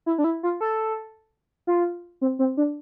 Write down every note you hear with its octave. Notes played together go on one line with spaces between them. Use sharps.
E4
D4
E4
F4
A4
F4
C4
C4
D4